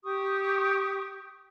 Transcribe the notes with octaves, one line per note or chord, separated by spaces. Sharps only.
G4 C#6 D#6